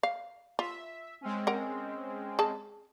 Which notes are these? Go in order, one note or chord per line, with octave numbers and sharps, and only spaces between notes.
F5
F4 E5
G#3 C4 C#4
A#4 F#5
G#4 A5